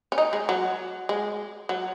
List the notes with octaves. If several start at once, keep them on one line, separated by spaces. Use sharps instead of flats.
C#4
D#4
G#3
F#3
G#3
F#3